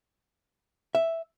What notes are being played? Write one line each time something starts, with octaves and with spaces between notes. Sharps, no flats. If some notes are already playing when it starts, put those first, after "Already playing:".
E5